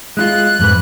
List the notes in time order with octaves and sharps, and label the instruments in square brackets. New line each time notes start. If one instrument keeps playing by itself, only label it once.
[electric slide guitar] G#3 E4 F4 [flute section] F#6
[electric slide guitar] F2 G#2 B4